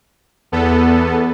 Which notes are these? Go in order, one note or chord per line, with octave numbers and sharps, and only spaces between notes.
E2 B3 A4